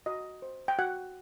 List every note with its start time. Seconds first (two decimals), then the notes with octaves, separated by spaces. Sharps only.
0.06 F#4 D#5
0.42 C5
0.68 G5
0.79 F#4 F#5